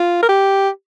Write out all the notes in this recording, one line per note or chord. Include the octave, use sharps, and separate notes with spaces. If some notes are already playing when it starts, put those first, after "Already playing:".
Already playing: F4
A#4
G4